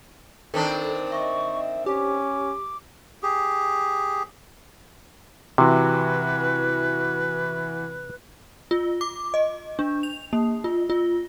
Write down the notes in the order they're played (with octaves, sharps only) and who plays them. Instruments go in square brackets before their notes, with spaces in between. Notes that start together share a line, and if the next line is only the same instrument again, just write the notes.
[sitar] D#3 C4 D4 [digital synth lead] A4
[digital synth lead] D#5 [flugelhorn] E5 [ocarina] C#6
[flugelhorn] C#4 [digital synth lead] G4 [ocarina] D6
[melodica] G4 G#4
[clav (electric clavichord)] C3 [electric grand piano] E3 F#4 [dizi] B4
[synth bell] F4
D6
D#5
D4
F7
A#3
F4
F4